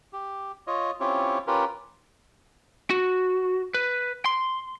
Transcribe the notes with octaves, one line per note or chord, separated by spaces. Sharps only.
G4
F4 C#5 D#5
C4 C#4 E4 F4 G4 C#5
C#4 F4 G4 A#4 B4
F#4
B4
C6